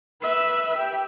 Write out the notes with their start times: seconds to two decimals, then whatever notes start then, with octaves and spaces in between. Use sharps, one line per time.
0.22 B4 E5
0.77 G4